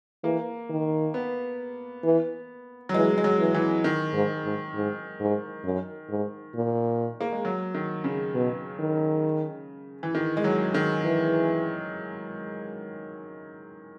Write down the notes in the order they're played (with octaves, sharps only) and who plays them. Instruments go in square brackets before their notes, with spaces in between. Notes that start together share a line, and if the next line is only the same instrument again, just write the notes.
[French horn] E3 [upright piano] A#3
[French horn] D#3
[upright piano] B3
[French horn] E3
[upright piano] F#3
[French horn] E3 [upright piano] G#3
[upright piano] G#3
F#3
[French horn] E3
[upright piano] E3
D#3
[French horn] G#2
G#2
G#2
G#2
F#2
G#2
A#2
[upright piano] A#3
G#3
F#3
D#3
C#3
[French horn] B2
D#3
[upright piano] E3
D#3
G#3
F#3
D#3
[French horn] E3